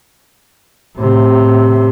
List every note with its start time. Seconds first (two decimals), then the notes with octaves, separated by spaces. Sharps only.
0.96 A2 C3